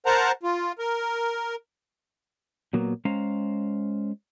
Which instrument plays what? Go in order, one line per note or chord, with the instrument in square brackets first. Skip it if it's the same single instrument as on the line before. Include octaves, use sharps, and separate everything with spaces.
[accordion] A#4 C5 F#5 A5 A#5
F4
A#4
[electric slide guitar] A#2 F#3 A#3 B3
G#3 C#4 C5 F5 A#5